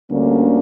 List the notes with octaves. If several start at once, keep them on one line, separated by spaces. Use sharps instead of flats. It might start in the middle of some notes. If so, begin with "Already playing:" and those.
D2 D3 G3 A#3 C#4